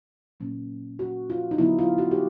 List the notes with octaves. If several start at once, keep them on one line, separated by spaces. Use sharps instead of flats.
A#2 F#3 A#3 C#4
F#4
F4
D#4
D3 F#3 B3 E4
F4
F#4
G4